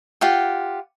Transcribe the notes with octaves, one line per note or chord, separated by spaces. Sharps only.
F4 G4 F#5 G5